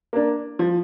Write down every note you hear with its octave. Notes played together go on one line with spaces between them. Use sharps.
A#3 D4
F3